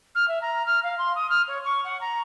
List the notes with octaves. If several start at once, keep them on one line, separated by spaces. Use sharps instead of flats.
F6
E5
A#5
F6
F5
C6
D#6
F6
C#5
C#6
F#5
A#5